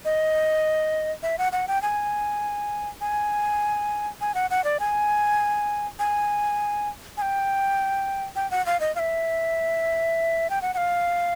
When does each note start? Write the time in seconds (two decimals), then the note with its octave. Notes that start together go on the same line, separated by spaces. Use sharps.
0.05 D#5
1.23 E5
1.38 F#5
1.52 F#5
1.68 G5
1.82 G#5
3.01 G#5
4.21 G#5
4.35 F#5
4.50 F#5
4.64 D5
4.80 G#5
5.99 G#5
7.17 G#5
7.22 G5
8.36 G5
8.51 F#5
8.66 F5
8.80 D#5
8.95 F5
8.99 E5
10.50 G5
10.62 F#5
10.74 F#5
10.77 F5